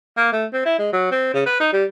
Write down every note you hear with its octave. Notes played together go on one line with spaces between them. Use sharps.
A#3
A3
C4
E4
G#3
F#3
C4
C#3
B4
D#4
G3